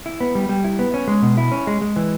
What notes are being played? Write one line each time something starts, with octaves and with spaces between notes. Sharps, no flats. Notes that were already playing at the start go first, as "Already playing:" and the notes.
E4
B3
G3
G3
E4
B3
C#4
G#3
B2
E4
C#4
G#3
G#3
E3